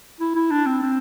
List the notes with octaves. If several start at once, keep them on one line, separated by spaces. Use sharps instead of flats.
E4
E4
D4
C4
C4